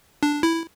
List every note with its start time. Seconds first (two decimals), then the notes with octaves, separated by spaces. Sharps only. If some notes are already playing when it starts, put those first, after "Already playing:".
0.23 D4
0.43 E4